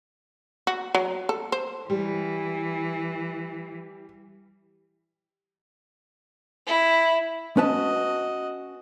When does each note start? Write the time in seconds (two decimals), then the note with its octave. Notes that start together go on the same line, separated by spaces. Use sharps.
0.67 F#4
0.95 F#3
1.29 A4
1.52 C5
1.90 E3 G3
6.67 E4
7.57 C#4 F#4 B4 D#5 A5